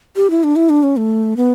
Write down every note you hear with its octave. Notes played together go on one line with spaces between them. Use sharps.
G4
E4
D4
E4
D4
C#4
A3
B3